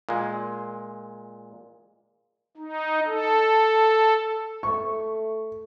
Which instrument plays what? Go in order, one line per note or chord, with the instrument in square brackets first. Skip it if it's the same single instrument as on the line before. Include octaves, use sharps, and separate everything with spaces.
[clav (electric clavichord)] A#2 G#3
[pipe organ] D#4
A4
[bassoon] A3 [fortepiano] C#6